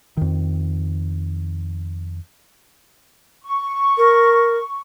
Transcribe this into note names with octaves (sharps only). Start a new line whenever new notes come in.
F2 D#3
C#6
A#4